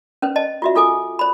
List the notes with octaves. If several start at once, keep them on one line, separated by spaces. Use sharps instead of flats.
C#4 B4 C5
D#5 A5
F4 F#4 E5
F4 A4 G#5 D6
C5 B5